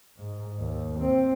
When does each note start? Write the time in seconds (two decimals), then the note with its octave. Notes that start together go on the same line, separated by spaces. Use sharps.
0.17 G#2
0.59 D#2
0.99 C4